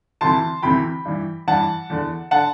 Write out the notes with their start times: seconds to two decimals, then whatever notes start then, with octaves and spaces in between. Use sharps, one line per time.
0.21 D2 C3 E3 A5 C6
0.62 D2 C3 E3 G5 B5
1.05 G2 E3
1.47 G2 E3 F#5 A5
1.90 E2 D3
2.31 D3 F#5 A5